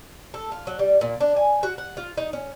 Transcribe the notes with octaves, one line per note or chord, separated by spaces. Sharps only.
A4
F4
F#3
G3
A#2
D4
G#5
F#4
F#5
F4
D#4
C#4